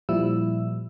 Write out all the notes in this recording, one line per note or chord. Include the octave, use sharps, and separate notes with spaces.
A#2 F3 G3 E4 E6